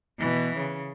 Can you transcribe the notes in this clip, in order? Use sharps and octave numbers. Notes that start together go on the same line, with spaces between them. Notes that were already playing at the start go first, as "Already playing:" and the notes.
B2 E3
C#3